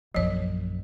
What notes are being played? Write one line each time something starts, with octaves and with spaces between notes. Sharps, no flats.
A#1 F#2 F3 C#5